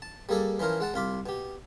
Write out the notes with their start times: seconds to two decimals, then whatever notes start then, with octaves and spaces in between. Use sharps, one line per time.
0.02 A5
0.29 G3 A#3 G#4 A4 D5
0.59 E3 F3 C#4 A#4 C5
0.80 G#3 F#5 A5
0.94 C2 F4 B5 D6
1.26 B2 G4